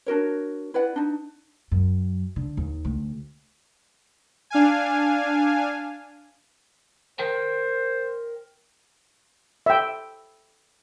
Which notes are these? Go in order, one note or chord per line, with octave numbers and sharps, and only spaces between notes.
D4 F#4 A#4 C#5
E4 B4 D5 F#5
D4 D#4
F#2
D3
D#2
D2
D4 F5 G#5
A#4 C5 G5
E5 G5